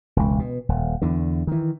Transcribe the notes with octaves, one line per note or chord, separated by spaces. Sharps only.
E1 C#2
B2
D#1
E2 D3
D#3 E3